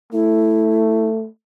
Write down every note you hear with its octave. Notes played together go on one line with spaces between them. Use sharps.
A3 E4